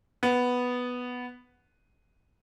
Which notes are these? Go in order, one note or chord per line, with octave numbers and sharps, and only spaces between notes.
B3